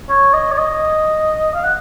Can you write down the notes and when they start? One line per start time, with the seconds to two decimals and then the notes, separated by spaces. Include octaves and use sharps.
0.09 C#5
0.34 D#5
0.52 C#5
0.58 D#5
1.54 F5
1.64 F#5